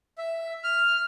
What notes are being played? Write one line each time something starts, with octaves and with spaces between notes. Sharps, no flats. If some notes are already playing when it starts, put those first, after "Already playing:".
E5
F6